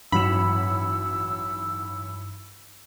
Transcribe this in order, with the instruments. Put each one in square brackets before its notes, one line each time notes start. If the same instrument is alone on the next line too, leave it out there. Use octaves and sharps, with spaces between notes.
[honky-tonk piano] A1 F#3 E7 [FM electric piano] G2 D#4 C#7 [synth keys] B5 [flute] E6